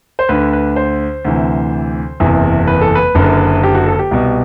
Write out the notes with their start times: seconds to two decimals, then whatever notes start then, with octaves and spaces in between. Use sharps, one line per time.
0.19 C5
0.29 D2 D3 B4
0.53 B4
0.76 C5
1.25 D2 C3 E3
2.20 F#1 E2 C3 E3
2.67 B4
2.81 A4
2.95 B4
3.15 F#1 F#2 D3
3.63 G4
3.75 F#4
3.86 A4
3.99 G4
4.11 C2 B2